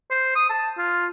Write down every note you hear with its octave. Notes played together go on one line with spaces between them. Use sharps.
C5
D#6
A5
F4